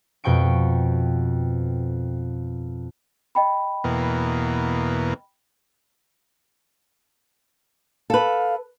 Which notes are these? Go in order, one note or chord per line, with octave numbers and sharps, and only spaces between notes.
F2 B2 G5 C#6 D7
D#5 G5 B5
E2 B2 A#3
A4 B4 F5